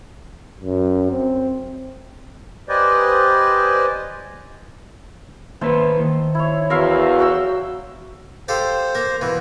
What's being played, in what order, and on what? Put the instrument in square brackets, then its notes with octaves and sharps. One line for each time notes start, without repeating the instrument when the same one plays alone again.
[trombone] F#2
C4
[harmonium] G4 B4 C5 D5 D#5 G#5
[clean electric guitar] D#3 A#3 B4 [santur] C5 E5 A5
[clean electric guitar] D#3
[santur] E4 C#5
[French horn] E2 [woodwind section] F#4 [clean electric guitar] A#4 [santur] E5 F5 C6
[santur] F#3 G5 E6
[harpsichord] G4 A4 F5 [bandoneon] C5
[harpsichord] A#3 A#4
B2 E3